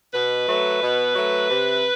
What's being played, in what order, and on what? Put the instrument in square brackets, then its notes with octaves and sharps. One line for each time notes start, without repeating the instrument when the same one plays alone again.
[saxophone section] B2 B4
F#3 A3
B2
F#3 A3
C3